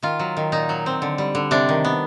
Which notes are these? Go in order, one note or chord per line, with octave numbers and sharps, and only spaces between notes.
D#3 F4
F#3
D#3
A#2 D#4
F#3
C4
D3
G3
D3
C3 D4
D#3
B3